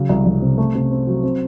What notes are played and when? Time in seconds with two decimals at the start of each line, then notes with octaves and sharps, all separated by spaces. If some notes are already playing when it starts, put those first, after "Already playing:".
Already playing: C#3 F#3
0.09 C2
0.26 C2
0.42 C3
0.58 A3
0.75 C3
0.91 C4
1.07 F#3
1.23 C4